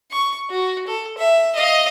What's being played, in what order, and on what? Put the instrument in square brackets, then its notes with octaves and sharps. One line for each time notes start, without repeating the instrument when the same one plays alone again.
[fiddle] C#6
F#4
A4
E5
D#5 F5